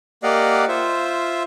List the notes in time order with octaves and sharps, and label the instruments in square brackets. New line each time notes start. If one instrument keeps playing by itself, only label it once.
[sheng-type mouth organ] A#3 G4 D5 D#5 F5 F#5
F4 C5 E5